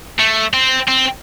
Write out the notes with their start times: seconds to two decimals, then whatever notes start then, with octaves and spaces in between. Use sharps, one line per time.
0.19 A3
0.54 C4
0.88 C4